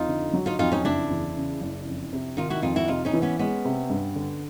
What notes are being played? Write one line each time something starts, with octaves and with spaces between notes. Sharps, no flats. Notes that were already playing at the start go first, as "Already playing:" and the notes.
Already playing: F2 D#4 F4
D3
F#3
D#4 F4
F2 D#4 F4
C#4 D#4
F#1 D4 E4
E2
C#3
F#1
F2
C3
D#3 D#4 F4
E4 F#4
F2 D#4 F4
E4 F#4
C3 D#4 F4
C#4 D#4
E3
B3 C#4
G#3 B3 C#4
C3
G2
D3